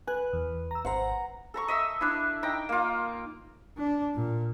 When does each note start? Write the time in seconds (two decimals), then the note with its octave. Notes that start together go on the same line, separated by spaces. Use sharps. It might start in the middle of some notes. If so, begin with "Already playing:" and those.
0.07 B4 G#5 F#6
0.33 E2
0.71 A#5 E6
0.85 G#1 C5 F#5 A#5
1.54 A4 A#5 C#6
1.68 D#5 E5 E6
2.01 D4 E4
2.43 D#4 G5 A#5
2.69 A#3 F4
3.78 D4
4.15 A#2